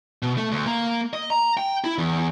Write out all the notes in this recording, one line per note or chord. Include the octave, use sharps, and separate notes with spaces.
B2
A3
D2
A#3
D#5
A#5
G5
E4
E2